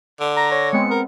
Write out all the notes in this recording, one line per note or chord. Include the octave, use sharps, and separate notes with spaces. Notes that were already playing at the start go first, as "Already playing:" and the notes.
D3
A#5 A#6
C#5
G#3 B3 C4 C#7
A#4